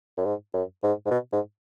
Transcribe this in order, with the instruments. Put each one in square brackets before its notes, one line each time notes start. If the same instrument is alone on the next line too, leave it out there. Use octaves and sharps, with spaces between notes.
[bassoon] F#2
G#2
F#2
G#2
G#2
B2
G#2